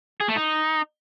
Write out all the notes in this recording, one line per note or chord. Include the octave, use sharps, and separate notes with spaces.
G#4
A3
D#4